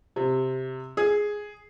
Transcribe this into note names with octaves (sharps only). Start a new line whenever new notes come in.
C3
G#4